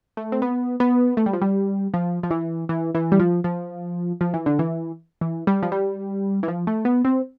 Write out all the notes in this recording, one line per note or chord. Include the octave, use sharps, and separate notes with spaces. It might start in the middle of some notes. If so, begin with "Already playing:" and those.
A3
C4
B3
B3
A3
G3
F3
G3
F3
F3
E3
E3
E3
G3
F3
F3
F3
E3
D3
E3
E3
G3
F3
G3
E3
F3
A3
B3
C4